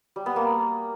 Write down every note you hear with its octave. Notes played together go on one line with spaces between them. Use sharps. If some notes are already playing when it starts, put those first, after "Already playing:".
G3
B3
A#3